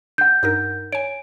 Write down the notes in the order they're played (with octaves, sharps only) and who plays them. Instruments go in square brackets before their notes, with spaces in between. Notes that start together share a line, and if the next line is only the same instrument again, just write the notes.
[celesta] F#5 G6
[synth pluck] G2 D#4 A#4
[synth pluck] C#5 G#5 [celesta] D7